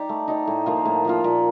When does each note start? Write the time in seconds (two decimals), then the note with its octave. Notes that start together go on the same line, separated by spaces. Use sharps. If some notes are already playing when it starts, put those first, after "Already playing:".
Already playing: D#4 G4 D5
0.09 A3
0.28 D#4 G4 D5
0.47 A2
0.66 F3 A#3 F4
0.85 A2
1.05 F3 A#3 F4
1.24 A#2